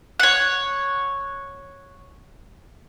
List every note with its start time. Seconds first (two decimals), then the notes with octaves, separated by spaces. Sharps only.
0.20 C#5 F#5